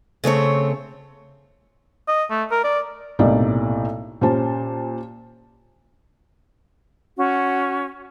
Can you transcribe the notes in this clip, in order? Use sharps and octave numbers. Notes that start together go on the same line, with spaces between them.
C#3 A3 C4 C#5
D#5
A3
A#4
D5
B1 A2 C3 A#3 D#4 D5
A#2 C#4 G4 C5 A5
C#4 F#4